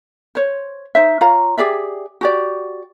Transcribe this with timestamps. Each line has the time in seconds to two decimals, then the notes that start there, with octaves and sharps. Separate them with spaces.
0.35 C5 C#5
0.95 D#4 C5 E5
1.21 F4 C#5 F5 A#5
1.58 G4 G#4 D5 E5
2.21 F#4 G4 D5